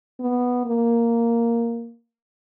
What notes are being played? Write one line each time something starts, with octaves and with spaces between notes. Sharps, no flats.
B3
A#3